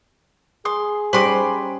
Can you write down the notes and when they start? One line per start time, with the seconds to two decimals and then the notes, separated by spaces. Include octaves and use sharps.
0.65 G#4 C6 D#6
1.13 G3 C#4 D#4 C5 B5 C6 D6